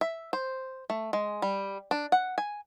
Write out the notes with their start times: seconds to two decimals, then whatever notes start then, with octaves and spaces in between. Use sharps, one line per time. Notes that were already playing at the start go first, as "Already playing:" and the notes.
0.01 E5
0.33 C5
0.90 A3
1.13 G#3
1.42 G3
1.91 D4
2.12 F#5
2.38 G#5